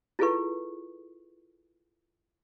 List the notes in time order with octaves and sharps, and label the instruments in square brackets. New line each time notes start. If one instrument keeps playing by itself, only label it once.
[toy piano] E4 F4 G#4 A4 B4 C#6